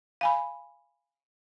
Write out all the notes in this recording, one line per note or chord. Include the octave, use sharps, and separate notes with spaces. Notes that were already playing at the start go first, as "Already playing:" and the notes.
F5 G#5 B5